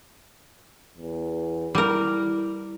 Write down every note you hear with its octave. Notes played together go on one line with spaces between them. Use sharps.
E2
G3 E4 A#4